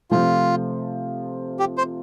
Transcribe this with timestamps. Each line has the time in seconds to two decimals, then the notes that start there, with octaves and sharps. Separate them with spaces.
0.11 C3 F3 A3 F4
1.59 G4
1.78 C5